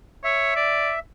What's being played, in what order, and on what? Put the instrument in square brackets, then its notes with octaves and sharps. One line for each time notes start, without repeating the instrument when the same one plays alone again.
[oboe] C#5 [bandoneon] E5
[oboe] D5